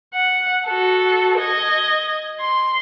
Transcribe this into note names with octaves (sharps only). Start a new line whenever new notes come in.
F#5
F#4 A4
D#5 G#6
C6